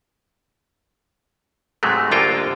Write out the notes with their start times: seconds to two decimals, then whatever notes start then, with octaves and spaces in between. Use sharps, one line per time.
1.83 G#2 C3 F#3 G#3 A3
2.11 C2 D3 A#3 F4 A4 G5